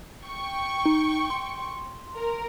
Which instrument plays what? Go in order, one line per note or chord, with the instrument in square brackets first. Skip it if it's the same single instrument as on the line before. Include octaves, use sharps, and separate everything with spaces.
[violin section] G5 C#6
[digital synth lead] D#4
C6
[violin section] A#4